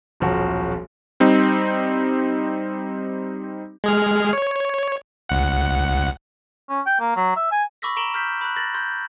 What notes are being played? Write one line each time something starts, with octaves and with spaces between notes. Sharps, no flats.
D#1 B1 F3 F#4
G3 C4 D#4
G#3 G#4 F6
C#5
C#2 F#5
C#4
G5
A#3
F#3
E5
G#5
B5 C#6 D6 E6 A#6 B6
A#5 C#6 D7 E7 F#7 G7
F6 G6 B6
B5 F#6
A6 A#6 F#7
C6 G6